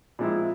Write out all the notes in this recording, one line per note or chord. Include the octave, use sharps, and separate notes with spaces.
A#2 F3 G#3 C4 E4